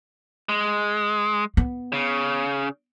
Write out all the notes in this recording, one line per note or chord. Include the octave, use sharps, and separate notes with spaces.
G#3
B3
C#3